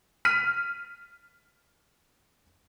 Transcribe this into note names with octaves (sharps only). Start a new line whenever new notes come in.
F6 B6 D#7